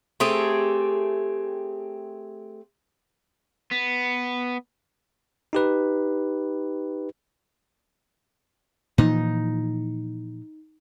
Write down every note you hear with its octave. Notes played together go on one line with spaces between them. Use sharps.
A3 C4 G4 G#4
B3
D#4 G4 B4
A#2 E3 F3 D#4